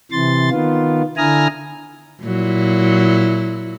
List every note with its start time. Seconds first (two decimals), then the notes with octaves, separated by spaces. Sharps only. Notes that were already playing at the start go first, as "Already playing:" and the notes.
0.12 C3 E3 C6 A6
0.51 D#3 B3 F4
1.17 D3 E4 G#5 A#5 D#6 F6
2.23 A#2 F#3 E4